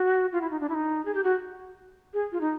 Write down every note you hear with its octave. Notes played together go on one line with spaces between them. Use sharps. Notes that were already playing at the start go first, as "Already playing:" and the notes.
Already playing: F#4
F4
E4
D#4
D4
E4
D#4
G#4
G4
F#4
G#4
F4
D#4